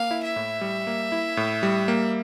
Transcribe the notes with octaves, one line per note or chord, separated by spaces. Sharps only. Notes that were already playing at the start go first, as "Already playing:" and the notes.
Already playing: A#3 F5
E4
E5
A2
G3
A#3
E4
A2
G3
A#3